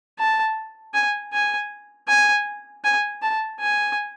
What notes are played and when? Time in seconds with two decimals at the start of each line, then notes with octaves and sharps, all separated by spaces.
0.19 A5
0.94 G#5
1.33 G#5
2.08 G#5
2.84 G#5
3.22 A5
3.60 G#5